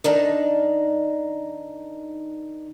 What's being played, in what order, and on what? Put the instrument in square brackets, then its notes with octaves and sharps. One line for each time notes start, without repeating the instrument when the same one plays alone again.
[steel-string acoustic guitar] D#3 D4 D#4